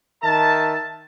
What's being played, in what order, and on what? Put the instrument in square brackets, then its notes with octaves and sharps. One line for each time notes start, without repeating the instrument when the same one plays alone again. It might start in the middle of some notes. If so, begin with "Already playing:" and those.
[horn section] D#3 A#4 E5 A5